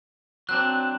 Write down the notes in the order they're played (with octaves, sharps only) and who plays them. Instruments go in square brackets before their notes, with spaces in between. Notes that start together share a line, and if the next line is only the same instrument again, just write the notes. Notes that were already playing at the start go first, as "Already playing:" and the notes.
[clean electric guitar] F#3 C4 D4 [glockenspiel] F#6